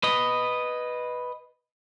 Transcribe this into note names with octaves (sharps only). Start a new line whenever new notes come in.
B4 D#5